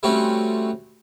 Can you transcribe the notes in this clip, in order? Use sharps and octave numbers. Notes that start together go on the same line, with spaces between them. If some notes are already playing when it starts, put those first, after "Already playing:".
G3 A3 C4 C#4 F#4 G4